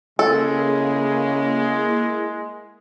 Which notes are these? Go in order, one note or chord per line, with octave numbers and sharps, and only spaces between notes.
C#3 G#3 A#3 E4 G#4 A4